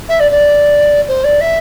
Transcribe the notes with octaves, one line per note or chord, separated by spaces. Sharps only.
E5
D5
D5
C5
D5
E5